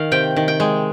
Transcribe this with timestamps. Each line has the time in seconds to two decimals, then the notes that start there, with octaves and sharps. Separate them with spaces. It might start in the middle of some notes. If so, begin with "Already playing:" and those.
Already playing: D#3 F5
0.12 C3 G5
0.36 D#3
0.48 G5
0.60 G#3